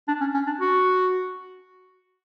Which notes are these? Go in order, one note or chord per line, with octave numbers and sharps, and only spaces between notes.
D4
C#4
C#4
D4
F#4